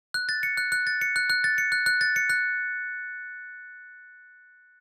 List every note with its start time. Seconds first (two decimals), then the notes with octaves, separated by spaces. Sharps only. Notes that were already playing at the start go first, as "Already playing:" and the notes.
0.14 F#6
0.29 A6
0.43 C#7
0.57 F#6
0.72 F#6
0.87 A6
1.01 C#7
1.16 F#6
1.30 F#6
1.44 A6
1.58 C#7
1.72 F#6
1.86 F#6
2.01 A6
2.16 C#7
2.30 F#6